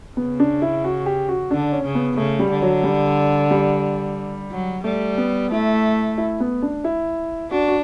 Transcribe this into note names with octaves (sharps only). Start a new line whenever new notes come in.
C#3 B3
D4
E4
F#4
G4
F#4
D3 D4
C#4
C#3
B3
C#3 A3
G3
D3
F#3
G3
G3
F#3
G3 A3
B3
A3 E4
E4
B3
D4
E4
D4 F#4
F#4